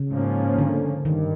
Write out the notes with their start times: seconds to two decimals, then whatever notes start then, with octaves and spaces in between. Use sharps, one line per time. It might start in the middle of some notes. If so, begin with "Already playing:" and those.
Already playing: C#3
0.11 G#2 F3 A#3 C#4
0.58 D3
1.05 G2 D#3